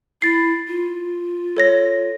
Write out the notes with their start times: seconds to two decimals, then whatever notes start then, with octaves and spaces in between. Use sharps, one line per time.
0.22 E4 A6 C7
0.68 F4
1.57 A4 C#5 A#6